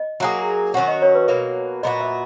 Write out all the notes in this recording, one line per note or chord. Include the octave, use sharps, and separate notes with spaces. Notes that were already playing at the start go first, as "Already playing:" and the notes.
Already playing: D#5
F#3 A#3 D#4 G#4
D#3 F#3 C#4 F#4 F#5
D#5
C#5
B4
B2 F#3 A#3
A#2 F#3 B3 F#4 D#5
E5